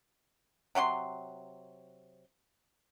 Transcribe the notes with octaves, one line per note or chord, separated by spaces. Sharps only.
C3 F#3 F4 C6